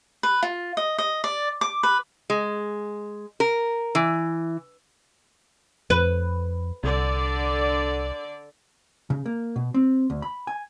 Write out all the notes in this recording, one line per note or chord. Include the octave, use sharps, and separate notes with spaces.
B4
F4
D#5
D#5
D5
D6
B4
G#3
A#4
E3
F2 B4
C2 D3 D5
C#3
A#3
B2
C4
D2
B5
G#5